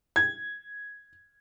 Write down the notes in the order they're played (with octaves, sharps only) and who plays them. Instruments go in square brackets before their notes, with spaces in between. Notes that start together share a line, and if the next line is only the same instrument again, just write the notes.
[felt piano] G#6